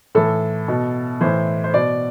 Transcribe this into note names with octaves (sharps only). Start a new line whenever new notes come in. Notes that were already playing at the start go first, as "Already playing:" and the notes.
A2 E3 A4
B2
A2 E3 C5
C5
B2 D5